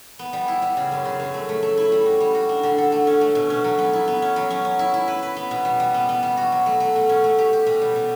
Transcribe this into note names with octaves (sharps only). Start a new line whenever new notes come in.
B3
G3
E4
G3
C#3
F#2
C#3
F#2
A3
A3
A3
E4
G3
F#4
G3
F#4
D4
D3
A4
A3
C#4
A3
B2
C#4
F#3
B3
E4
B3
C#4
F#3
C#4
C#4
E4
E4
B4
B4
B3
B2
G3
G3
B3
B3
G3
F#4
F#3
A3
A3
B2
C#4
A3
G4
G4
B2
G3
B2